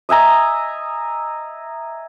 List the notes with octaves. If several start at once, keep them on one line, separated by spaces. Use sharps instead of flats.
D#5 E5 G#5 A#5